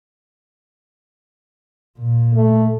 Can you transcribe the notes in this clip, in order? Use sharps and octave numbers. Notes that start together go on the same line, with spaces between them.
A#2
A3